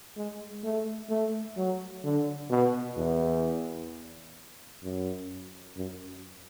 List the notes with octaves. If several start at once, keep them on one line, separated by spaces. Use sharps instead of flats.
G#3
A3
A3
F#3
D3
B2
E2
F#2
F#2